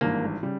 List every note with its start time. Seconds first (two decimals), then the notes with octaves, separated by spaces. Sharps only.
0.01 G#1 G2 E3 A#3
0.43 C#3 G3